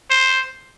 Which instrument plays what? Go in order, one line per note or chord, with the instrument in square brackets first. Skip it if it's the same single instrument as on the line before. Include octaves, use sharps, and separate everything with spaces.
[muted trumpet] C5